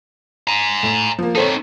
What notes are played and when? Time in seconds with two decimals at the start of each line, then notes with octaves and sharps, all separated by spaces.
0.48 G#5 A#5
0.83 A2 E7
1.19 F3 A#3
1.35 C4 D#4 A4 C5 C#5